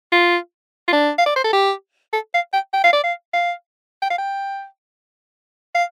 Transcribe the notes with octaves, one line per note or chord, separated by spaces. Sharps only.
F4
F4
D4
F5
D5
C5
A4
G4
A4
F5
G5
G5
F5
D5
F5
F5
G5
F5
G5
F5